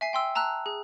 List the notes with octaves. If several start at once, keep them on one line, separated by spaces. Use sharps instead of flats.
E5 G#5 C7
G5 C6 E6
A5 A#5 E6 F#6
G#4